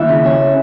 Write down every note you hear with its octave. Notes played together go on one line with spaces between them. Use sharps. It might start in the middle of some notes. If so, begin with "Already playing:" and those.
Already playing: D#2 E4
C#3
C#4